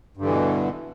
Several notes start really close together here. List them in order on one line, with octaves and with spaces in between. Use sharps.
G2 D3 E3 B2